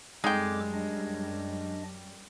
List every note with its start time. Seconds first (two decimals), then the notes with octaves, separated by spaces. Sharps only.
0.24 F#2 G3 G#3 C4 D#4 A4 G5 D6
0.73 D4 D#5